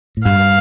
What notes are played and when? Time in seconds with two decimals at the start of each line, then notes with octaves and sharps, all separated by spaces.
0.17 A2
0.25 G2 F5